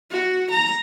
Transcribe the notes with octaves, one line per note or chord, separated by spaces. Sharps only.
F#4
A#5